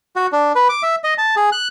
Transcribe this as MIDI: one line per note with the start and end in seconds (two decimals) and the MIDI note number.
0.16 0.27 66
0.32 0.52 62
0.55 0.68 71
0.69 0.83 86
0.83 0.96 76
1.04 1.14 75
1.18 1.35 81
1.36 1.50 68
1.52 1.68 90